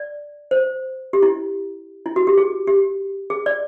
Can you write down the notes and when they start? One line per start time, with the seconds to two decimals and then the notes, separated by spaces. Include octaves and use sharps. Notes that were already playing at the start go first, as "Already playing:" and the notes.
Already playing: D5
0.51 C5
1.13 G4
1.22 E4
2.06 E4
2.16 F#4
2.27 G4
2.38 G#4
2.67 G4
3.30 G#4
3.46 D5